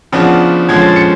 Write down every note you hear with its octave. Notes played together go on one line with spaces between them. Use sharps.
C#3 F3 B3 D4
D3 F3 G#3 C#4 G#6
A6
C#7